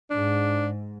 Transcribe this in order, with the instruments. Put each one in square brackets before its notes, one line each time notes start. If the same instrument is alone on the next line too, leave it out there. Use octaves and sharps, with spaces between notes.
[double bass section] G#2 [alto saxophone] D4